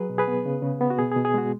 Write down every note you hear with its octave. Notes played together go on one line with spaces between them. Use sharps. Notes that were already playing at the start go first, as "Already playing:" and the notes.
Already playing: F#3 G#4 B4
B2
G#4 B4
B3
C#3
C#3
B3
F#4
B2 G#4
G#4
B2
G#4
G#3 F#4